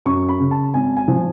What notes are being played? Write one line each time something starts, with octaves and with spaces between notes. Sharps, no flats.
F#2 C#6
B5
C#3
A5
G#1 G#5
G#5
F3